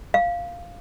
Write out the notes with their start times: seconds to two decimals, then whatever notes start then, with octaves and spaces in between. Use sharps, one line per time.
0.14 F5